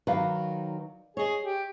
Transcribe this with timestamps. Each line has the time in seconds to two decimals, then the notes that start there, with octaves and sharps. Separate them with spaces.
0.07 D#3 F#3 B4 D5 F5
1.17 G#4 C#5 D#5
1.42 G4